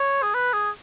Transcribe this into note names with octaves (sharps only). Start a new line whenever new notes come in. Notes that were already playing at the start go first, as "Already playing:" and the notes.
Already playing: C#5
G#4
B4
G#4